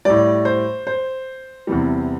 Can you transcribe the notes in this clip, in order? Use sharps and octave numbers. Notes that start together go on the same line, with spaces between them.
A2 G3 D5
C5
C5
E2 C3 E3 G3